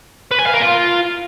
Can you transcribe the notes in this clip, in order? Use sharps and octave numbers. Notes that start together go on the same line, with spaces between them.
B4
G#5
F5
A#4
F4